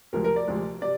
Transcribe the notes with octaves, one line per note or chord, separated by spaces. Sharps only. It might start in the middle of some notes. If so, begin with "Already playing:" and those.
D2 C3 F3 G#3 A#4
A#4
D5
D2 C3 F3 G#3
C3 D5